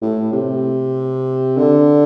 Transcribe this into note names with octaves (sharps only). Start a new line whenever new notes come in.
A2
C3
D3